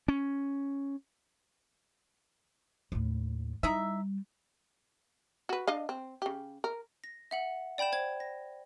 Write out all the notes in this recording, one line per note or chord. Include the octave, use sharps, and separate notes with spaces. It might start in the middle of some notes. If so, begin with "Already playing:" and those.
C#4
D#2 A2
G3 D#4 E4 E5
F#4 B4
D4 D#5 F5
C4
C#3 G4
A#4
A#6
E5 F#5 F#7
D5 G5 B5 G6 E7
C5 G#6
A#6